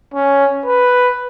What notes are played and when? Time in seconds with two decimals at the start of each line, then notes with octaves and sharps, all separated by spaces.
0.14 C#4
0.66 B4